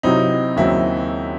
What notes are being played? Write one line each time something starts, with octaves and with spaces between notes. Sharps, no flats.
C3 F#3 C4 D#4 E4
D#2 C#3 F#3 C4 E4